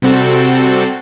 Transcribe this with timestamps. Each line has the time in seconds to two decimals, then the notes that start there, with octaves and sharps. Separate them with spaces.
0.02 C3 G3 C4 F#4 A4